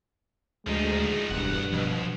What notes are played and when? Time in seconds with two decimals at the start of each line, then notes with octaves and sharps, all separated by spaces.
0.67 D2 F3 G#3 D#4
1.30 E1 B1 G2 F#5
1.73 F2 B2